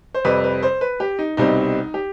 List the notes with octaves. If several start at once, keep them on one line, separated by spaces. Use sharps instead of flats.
C5
F2 C3 G3 C4 B4
B4
C5
B4
G4
D#4
C2 B2 G3 C4 D#4
G4